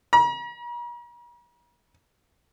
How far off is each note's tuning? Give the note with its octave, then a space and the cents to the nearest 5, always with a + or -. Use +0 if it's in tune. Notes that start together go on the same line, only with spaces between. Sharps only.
A#5 +45